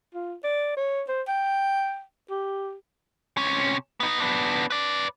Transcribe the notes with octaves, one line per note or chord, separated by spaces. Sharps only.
F4
D5
C#5
C5
G5
G4
C3 C#4
B3 D#4
B3 D4
B4 D5